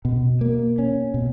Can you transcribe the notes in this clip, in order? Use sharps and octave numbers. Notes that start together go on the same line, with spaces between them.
B2
A#3
C#4
B2